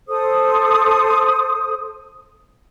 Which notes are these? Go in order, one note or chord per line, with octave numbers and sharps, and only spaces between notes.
A4 C5 D#6